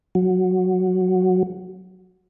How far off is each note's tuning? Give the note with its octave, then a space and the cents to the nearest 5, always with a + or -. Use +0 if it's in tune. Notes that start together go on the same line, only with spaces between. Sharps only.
F#3 -5